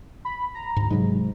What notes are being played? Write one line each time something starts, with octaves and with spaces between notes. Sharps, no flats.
B5
A#5
D2 G#2
G#2 C3 F#3 G#3